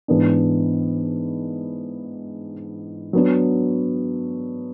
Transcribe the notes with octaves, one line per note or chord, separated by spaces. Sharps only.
G#2 E3 B3 D4
F#3 B3 D4